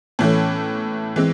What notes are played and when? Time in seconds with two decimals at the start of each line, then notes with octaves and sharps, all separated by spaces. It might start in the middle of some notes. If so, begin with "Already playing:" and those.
0.19 A2 E3 A3 C#4
1.16 E3 G#3 C4